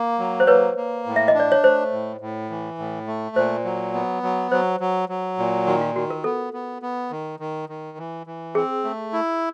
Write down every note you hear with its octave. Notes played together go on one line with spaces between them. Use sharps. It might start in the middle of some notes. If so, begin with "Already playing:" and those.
Already playing: A#3
F#3
C5
A#3 B4 C#5
A#3
A2
E5
D#5
D4
D5
C#5
A3 C5
A2
A2
E3
A2
A3
A#2 C5
F#3
B3
F#3
F#3 C5
F#3
F#3
A#2
D#3 F#4
F4
D#3 F#4
A#4
B3 A4
B3
B3
D#3
D#3
D#3
E3
E3
C4 G#4
A3
E4